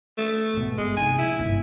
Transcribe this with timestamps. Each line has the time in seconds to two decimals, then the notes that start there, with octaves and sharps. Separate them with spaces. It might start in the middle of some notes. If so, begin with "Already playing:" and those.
0.18 A3
0.54 G#2 B2
0.77 G1 G#3
0.97 C3 D#4 G#5
1.18 A#1 E4
1.39 G1 G#2